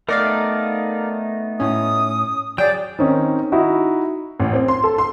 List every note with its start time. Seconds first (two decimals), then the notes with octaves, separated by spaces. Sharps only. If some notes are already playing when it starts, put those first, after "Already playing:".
0.08 A3 B3 D#4 A#4 D5 F5
1.60 A2 C#4 D#6
2.58 F#3 G#4 D5 G5
2.99 D#3 C4 C#4 D#4
3.52 D#4 E4 F#4
4.40 A1
4.53 C4
4.68 C6
4.84 A4
4.98 C6